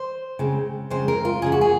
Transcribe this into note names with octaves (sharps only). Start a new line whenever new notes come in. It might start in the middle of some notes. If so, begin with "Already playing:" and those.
Already playing: C5
C#3 G#3 C4
C#3 G#3 C4 C5
A#4
F4
C#3 G#3 C#4 G#4
F#4
G#4